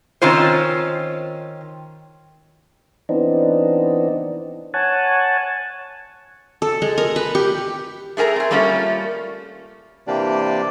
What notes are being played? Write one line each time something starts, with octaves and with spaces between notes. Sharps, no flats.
D#3 C4 C#4 F4 C5
E3 B3 C4 D4 D#4
C#5 F#5 G#5 A5
A4
G#3
A#4
B4
G4
A3 G#4 A#4 G#5 A#5
C4 G#4
G3 A3 A#3 C#4 D#4 F4
C3 E3 A#3 D4 G4 D5